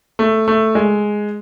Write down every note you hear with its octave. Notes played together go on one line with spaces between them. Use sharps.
A3
A3
G#3